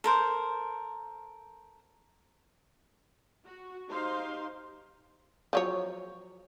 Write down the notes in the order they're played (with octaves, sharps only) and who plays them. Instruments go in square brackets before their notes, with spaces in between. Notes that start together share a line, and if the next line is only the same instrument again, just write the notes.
[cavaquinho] A4 A#4 C5
[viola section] F#4
D#4 G4 C5 F5 C6
[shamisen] F3 F#3 C#5